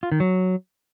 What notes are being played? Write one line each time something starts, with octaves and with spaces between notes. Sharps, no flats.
F4
D#3
F#3